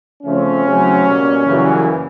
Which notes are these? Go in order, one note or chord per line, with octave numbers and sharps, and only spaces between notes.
C#3 F3 A3 C4 C#4
E2 C#3 F#3 A3 C4
B2 G3 A#3
F#2 C#3 E3 G3 A#3